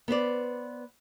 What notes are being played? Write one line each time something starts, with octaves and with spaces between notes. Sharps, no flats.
B3 B4 C5 D5